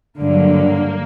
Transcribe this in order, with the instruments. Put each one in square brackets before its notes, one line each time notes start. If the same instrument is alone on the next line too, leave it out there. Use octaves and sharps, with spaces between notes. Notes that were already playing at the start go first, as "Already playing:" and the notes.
[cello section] G2 D3 F#3 [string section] A#3